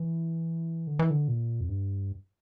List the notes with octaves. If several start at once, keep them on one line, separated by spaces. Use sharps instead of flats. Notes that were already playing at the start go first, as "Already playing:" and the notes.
Already playing: E3
D3
E3
D3
A#2
F2
G2